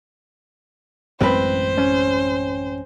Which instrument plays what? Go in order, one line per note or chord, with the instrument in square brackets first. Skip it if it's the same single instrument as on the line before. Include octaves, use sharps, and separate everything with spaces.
[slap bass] A1 F#2 G#3 [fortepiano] C4 B4 [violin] C5
[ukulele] C#4